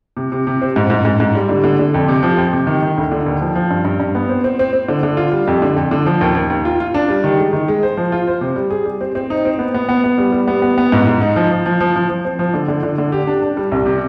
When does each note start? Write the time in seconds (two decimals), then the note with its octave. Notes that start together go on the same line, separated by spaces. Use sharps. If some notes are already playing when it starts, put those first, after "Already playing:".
0.17 C3
0.32 C3
0.47 C3
0.62 C4
0.76 G#2
0.90 G#2
1.05 G#2
1.20 G#2
1.35 G3
1.49 D3
1.64 D3
1.79 D3
1.94 F2
2.08 C3
2.23 F3
2.37 F2
2.53 C3
2.67 D#3
2.82 D#3
2.97 D2
3.12 D3
3.26 D#2
3.41 F3
3.55 F3
3.70 G2
3.85 G2
4.00 G2
4.15 B3
4.29 C4
4.44 C4
4.59 C4
4.73 C4
4.88 D3
5.03 D3
5.17 F4
5.32 G3
5.47 F2
5.62 D3
5.76 F2
5.91 D3
6.06 F3
6.21 D#2
6.35 D#2
6.50 D#2
6.65 F4
6.80 F4
6.94 D4
7.09 G3
7.24 D#3
7.38 G#3
7.53 D#3
7.68 G#3
7.83 C5
7.97 F3
8.12 F4
8.27 C5
8.41 C3
8.56 G3
8.70 G#4
8.86 G3
9.01 C4
9.15 C4
9.30 D#4
9.45 C4
9.59 B3
9.74 B3
9.89 B3
10.04 B3
10.18 G3
10.32 G3
10.48 B3
10.62 B3
10.78 B3
10.92 G#2
11.07 G#2
11.21 D#4
11.36 F3
11.51 F3
11.66 F3
11.80 F3
11.96 F3
12.09 F3
12.25 C4
12.39 F3
12.54 D3
12.68 D3
12.83 D3
12.98 D3
13.12 G4
13.27 D4
13.42 D4
13.57 G3
13.72 C2
13.86 C3